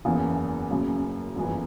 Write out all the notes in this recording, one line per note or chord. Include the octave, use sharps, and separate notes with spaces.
F#1 E2 C#3 E3
F#1 F#2 C#3
G1 F#2 C#3 E3